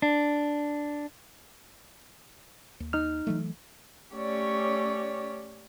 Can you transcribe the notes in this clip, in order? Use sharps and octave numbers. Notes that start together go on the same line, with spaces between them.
D4
D#2
D#4 F6
E3 F#3 A3
A3 C#4 G4 C#5 D5